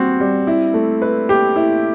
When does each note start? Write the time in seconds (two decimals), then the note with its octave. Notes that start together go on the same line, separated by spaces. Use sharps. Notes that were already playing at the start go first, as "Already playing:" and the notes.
Already playing: G3 C4 F#4
0.20 G3
0.47 E4
0.74 A3
1.02 B4
1.29 G4
1.56 E4